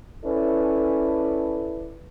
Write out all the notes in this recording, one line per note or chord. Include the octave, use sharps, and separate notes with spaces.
C#4 E4 A4 B4 D5